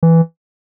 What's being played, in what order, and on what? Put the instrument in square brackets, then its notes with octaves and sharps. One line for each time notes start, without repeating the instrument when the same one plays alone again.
[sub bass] E3